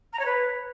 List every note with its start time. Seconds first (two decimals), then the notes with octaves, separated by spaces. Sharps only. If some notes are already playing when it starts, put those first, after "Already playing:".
0.13 A#5
0.19 C#5
0.25 B4